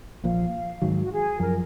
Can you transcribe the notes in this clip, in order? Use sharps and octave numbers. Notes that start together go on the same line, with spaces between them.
A#1 A#2 F3 F5
G#2 D#3 F#3
F#4
G#4
F#2 F3 A#4